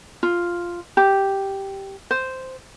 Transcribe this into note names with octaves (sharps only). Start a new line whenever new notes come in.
F4
G4
C5